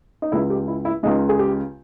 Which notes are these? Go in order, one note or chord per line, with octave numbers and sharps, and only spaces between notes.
D#4
C#2 C#3 G#3 E4
G4
E4
E4
C#2 C#3 G#3 D#4
G#4
G4